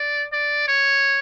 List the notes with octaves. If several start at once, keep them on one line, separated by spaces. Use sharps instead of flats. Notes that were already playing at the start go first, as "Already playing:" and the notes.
Already playing: D5
D5
C#5